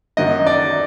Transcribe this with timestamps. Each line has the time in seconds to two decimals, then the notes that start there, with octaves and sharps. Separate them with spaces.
0.17 F#2 D#3 F#3 D#5
0.46 D5